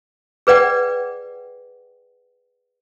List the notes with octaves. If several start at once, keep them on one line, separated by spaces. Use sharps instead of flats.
G#4 B4 D5 F#5 G5